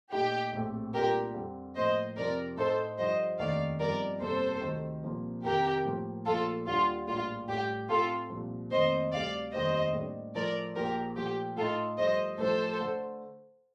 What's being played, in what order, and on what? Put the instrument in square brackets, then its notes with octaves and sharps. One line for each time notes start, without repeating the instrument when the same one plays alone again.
[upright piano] A#2 A3 D#4 [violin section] G4
[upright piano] A#1 A2 A3 C4
[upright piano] C2 A#2 A3 D4 F4 [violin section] G4 A#4
[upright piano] F2 D3 G3 C4
[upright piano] A2 F3 A#3 [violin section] C5 D#5
[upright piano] F2 C3 F3 C4 [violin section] A#4 D5
[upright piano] A2 A3 D#4 [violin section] A4 C5
[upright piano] G2 D3 F3 [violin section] C5 D#5
[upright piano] F1 D#2 D#3 A3 D4 [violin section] D5 F5
[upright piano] G1 G2 F3 C4 D#4 [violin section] A#4 D5
[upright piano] G1 F2 C3 G3 A#3 [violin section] A4 C5
[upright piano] D2 C3 D#3
C2 A#2 F3 A#3
[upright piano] F2 C3 D#3 [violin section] G4 A#4
[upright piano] A2 F3 A#3
[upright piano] A#1 A#2 F3 A3 [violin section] F4 A4
[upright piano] D#2 D3 G3 D4 G4 [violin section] F4
[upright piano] A#1 A2 G3 A#3 D4 [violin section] F4
[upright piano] A1 A2 G3 [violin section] G4
[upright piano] A2 A3 C4 [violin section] F4 A4
[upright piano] C2 A#2 F3
[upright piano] F1 F2 D#3 A#3 [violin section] C5 D#5
[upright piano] D2 C3 G3 [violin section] D5 F5
[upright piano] F1 D#2 D#3 G3 [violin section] C5 D#5
[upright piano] A2 G3 A#3 D4
[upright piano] A2 F3 A3 [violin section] A#4 D5
[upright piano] A#1 A#2 F3 [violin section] G4 A#4
[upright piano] A#2 F3 A3 [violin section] G4
[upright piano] A2 A3 D#4 [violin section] F4 A4
[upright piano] G2 F3 A3 [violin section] C5 D#5
[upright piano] A1 A2 F3 [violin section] A4 C5
[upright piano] D3 A3